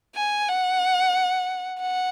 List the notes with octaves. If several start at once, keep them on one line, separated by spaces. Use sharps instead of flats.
G#5
F#5
F#5